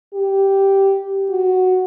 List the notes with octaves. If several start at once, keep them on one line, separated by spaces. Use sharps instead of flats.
G4
F#4